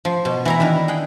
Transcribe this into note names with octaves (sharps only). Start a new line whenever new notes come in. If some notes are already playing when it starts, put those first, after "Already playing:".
F3
B2
E3 E4 A#5
D#3 D4 E4 B4
G#4 F#5 G5